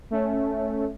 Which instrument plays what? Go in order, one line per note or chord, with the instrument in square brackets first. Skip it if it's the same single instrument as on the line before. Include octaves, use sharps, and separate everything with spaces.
[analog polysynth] A3 C#4